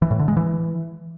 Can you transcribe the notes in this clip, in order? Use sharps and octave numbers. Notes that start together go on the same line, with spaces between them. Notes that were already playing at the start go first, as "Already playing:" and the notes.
E3
A2
D3
G#3
E3